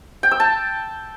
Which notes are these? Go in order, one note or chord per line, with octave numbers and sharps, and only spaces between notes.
G5
E6
A5